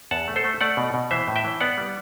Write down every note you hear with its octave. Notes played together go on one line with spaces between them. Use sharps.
E2 F#5 A5
A3
A4 C5
A3
A3 D5 F#5
B2
B2
E3 C5 E5
A2
E5 G5
E3
B3 D5 F#5
G3